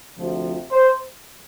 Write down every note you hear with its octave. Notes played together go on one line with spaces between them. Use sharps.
D2 C3 F3
C5